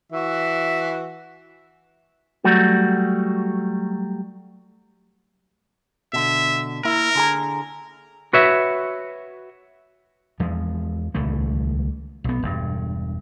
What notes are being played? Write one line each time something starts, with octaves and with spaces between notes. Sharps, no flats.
E3 F#4 E5
F#3 G3 A3 F#4
B2 D3 E5
A#3 E4 A#4
D3 G#4 A#5
F#4 B4 C#5 E5
E2 F3 G#3
D#1 C#2 E3 A3
B1 B3
E1 G2